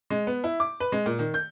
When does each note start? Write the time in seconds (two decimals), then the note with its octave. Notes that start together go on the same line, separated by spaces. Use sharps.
0.10 G#3
0.27 B3
0.44 E4
0.60 D6
0.80 B4
0.92 G#3
1.06 A#2
1.19 D#3
1.34 G6